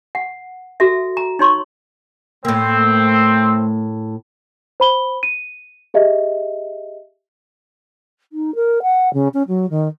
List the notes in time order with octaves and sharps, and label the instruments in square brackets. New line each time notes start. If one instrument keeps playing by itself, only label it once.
[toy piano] F#5
F#4 A4 E5
A#5
D#4 C#5 C6 C#6
[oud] A2 A#3 [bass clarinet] A3 [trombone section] C4
[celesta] C5 B5 G7
D#7
G4 G#4 D#5 E5
[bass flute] D#4
A#4
F#5
C#3
C#4
F#3
D#3